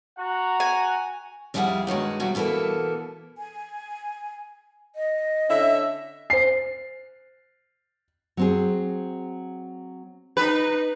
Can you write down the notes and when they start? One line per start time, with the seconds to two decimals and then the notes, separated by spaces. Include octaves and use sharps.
0.18 F#4 F#5 A#5
0.60 G#5
1.54 F2 G3 E4 G#4 F5 F#5
1.87 G2 D#3 F#3 G#3
2.20 E2 B2 G3 F#4
2.35 B2 E3 A#3 B3 A4
3.38 G#5
4.96 D#5
5.49 D3 C#4 E5
6.30 C5 G#5 C7
8.37 F#3 C4 G#4
10.37 D#4 B4